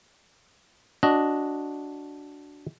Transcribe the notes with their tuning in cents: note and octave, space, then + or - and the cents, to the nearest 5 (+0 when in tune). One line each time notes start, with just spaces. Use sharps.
D4 -10 F#4 +0 D#5 +0